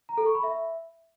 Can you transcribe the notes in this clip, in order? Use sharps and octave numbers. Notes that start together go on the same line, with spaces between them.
A#5
A4
C#6
B5
E5